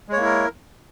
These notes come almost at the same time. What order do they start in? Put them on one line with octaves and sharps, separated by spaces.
G#3 C#5 A#3 E4 A#4